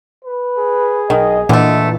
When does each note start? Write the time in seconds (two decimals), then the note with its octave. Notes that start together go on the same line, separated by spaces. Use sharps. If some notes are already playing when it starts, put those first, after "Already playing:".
0.24 B4
0.58 G#4
1.10 B1 D#3 D#5
1.49 A#2 D3 E3 A3 D#5